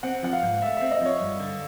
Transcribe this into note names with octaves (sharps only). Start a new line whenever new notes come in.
C4 F#5
F3 F#5
F5
G#2
A3 E5
C4 E5
D#5
F3 C#5
G2
D3